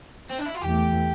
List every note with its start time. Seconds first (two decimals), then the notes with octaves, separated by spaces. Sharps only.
0.30 C4
0.38 D4
0.46 E4
0.55 F4
0.62 E2 E3 A3 G4